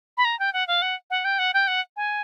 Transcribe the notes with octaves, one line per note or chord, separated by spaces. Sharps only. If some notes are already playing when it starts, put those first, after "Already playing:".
B5
A#5
G5
F#5
F5
F#5
F#5
G5
F#5
G5
F#5
G#5